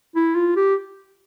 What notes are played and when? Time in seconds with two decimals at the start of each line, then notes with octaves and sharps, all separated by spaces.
0.15 E4
0.35 F4
0.56 G4